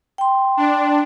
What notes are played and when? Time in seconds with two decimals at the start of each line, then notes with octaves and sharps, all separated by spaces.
0.18 G5 C6
0.57 D4